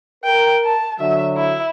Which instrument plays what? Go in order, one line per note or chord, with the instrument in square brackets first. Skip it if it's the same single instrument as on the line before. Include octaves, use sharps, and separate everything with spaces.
[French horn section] A#4 [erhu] G5
[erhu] A5
[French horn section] D3 F#3 F#4 [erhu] E5
[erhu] E4